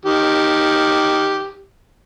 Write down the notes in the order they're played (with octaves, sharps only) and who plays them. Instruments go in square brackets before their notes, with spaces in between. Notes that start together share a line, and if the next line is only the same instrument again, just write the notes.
[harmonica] D#3 G4